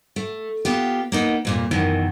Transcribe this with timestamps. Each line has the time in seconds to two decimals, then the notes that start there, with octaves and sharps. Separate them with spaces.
0.16 A3
0.65 B3 F4 G4
1.12 A#3 B3 D#4
1.45 F2 A#2 G3
1.71 F#2 B2 D#3 E3